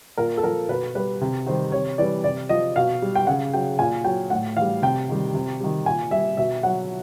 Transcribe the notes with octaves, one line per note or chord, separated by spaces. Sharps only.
A#2 A#4
A4
F3 A#4
B2 B4
G3 B4
C3
D#3 G3 C5
C3 C#5
E3 G3 D5
C3 D5
F3 D#5
B2 F5
G3
G5
C#3 F#5
F#3 G5
A#2 G#5
F#3 G5
A2 F#5
E3 F5
G3
C3 G5
D#3 G3
C3
D#3 G3
A#2 G#5
G3 E5
B2 E5
F#3 F#5